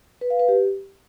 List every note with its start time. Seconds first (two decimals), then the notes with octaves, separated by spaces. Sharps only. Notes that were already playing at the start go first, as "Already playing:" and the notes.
0.21 B4
0.30 F5
0.39 B4
0.48 G4